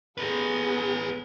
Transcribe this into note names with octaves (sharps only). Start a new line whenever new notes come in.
B3 G#4 A4 B4